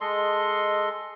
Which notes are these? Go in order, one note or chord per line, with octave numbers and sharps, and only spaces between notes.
G#3 A4 D#5 C6